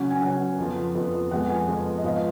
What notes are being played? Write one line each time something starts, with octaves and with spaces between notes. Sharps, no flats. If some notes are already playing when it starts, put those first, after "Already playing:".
Already playing: C#3 F#3 C#4 F#5
G#5
C#3 F#3 C#4 F#5
F2 F3 B3
F2 F3 B3
F2 F3 G#3 B3 F#5
G#5
F2 F3 G#3 B3
D#5
G#2 F3 B3 F5